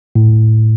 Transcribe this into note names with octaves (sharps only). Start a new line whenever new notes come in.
A2